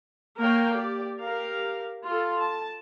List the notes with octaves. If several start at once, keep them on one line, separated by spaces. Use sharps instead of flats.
A#3 A#4 C#5 F5 G5
G4 D5
G4 A#4 F5
F4 A4
A5